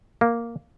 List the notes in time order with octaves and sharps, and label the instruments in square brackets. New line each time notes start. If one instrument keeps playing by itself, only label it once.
[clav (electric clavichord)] A#3